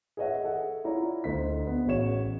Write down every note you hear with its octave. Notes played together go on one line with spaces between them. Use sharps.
G#4 B4 C#5 D#5 E5 F#5
G#4 A4 F#5
E4 F4 C#5 D5 A#5
D2 C5 D#5 B6
B3
A1 F#4 G#4 C#5 E7